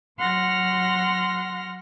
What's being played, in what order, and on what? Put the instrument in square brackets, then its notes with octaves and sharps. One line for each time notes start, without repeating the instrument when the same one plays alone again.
[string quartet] F#3 F#5 C6 F6 A#6